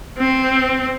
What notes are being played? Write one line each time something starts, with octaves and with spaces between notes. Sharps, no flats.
C4